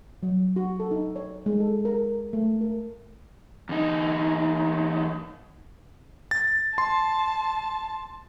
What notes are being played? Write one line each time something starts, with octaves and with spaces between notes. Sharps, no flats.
F#3
F#4
A4
D#4
C#5
G#3
A4
A#4
A3
A#4
E2 D#4
A6
A5 C6